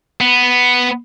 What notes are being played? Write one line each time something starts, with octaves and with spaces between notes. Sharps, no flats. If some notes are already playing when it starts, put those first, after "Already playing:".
B3